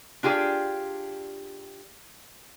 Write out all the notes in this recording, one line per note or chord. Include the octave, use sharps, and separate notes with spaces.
D4 F4 G4 G#4 D5